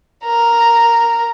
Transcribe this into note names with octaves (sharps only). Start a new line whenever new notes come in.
A#4